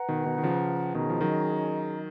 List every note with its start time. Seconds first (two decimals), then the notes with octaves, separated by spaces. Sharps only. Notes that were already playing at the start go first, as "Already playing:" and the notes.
Already playing: B4 F#5 A#5
0.09 B2 D#3
0.26 B2 D#3
0.38 D#3
0.43 C#3 F3
0.95 B2 D#3 C#4 G#4 D#5 A#5
1.10 F3
1.21 D#3 F#3